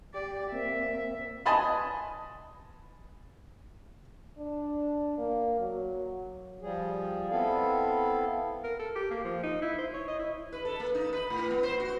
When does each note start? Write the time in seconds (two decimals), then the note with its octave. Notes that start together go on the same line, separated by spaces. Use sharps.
0.14 G4 D5
0.52 A#3 C4 E5
1.46 B4 D#5 G#5 A5 B5 C6
4.38 D4
5.18 A#3
5.60 F#3
6.62 F3 G3 G#4
7.30 B3 C4 E4 A4 F5
8.64 A#4
8.79 A4
8.95 G4
9.11 A#3
9.24 F3
9.43 D#4
9.62 E4
9.78 C5
9.94 C#5
10.08 D#5
10.19 E4
10.53 B4
10.65 A4
10.80 A#3
10.95 D#4
11.13 B4
11.30 A2
11.51 B3
11.63 C5
11.80 F#4